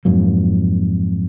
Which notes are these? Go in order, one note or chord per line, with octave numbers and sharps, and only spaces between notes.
F2 G#2 F#3 A#3